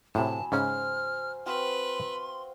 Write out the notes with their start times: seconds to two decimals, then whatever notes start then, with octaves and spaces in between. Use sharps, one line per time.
0.15 A2 C3 F#3 G#5 A5 B5
0.52 G#2 C#3 C#4 C5 F6
1.46 C4 F#4 B4 F5 C6